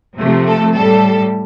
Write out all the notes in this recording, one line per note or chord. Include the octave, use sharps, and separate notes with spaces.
C3 F3 A3
A4
A2 G3 A4